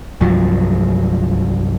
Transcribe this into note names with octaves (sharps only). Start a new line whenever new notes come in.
C2 G2 F3 F#3